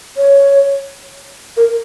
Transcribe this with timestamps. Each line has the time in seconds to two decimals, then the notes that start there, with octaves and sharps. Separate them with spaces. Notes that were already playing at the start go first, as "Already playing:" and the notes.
0.17 C#5
1.57 A#4